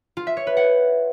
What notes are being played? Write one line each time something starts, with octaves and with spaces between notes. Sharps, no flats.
F4
E5
C#5
B4
F#5